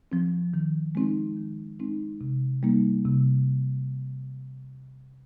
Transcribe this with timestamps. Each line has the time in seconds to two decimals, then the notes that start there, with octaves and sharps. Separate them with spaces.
0.12 F3 C4
0.54 D#3
0.95 G#3 C4 D#4
1.37 D#3
1.80 G#3 C4 D#4
2.21 C3
2.63 G3 A#3 D#4
3.05 C3